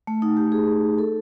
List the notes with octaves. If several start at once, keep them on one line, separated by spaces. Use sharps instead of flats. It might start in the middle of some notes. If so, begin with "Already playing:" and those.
A3
D#4
G4
G#4
A4